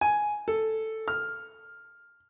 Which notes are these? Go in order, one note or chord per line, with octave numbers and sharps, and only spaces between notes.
G#5
A4
F6